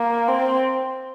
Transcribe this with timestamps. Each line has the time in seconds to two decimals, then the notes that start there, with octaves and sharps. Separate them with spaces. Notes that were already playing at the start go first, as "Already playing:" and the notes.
Already playing: A#3
0.28 C4